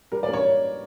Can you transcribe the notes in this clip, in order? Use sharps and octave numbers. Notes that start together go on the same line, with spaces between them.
G3 A#4
D5
A#3 C#5